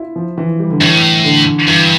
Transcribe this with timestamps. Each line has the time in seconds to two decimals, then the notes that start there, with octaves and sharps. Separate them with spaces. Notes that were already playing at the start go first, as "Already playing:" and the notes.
Already playing: E4 F4
0.16 F3
0.38 E3
0.59 G3
0.70 D3
0.81 A2 E3
1.24 D3
1.67 G2 E3